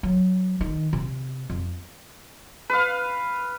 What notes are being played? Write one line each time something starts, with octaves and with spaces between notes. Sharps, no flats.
F#3
D#3
C3
F2
B4 F5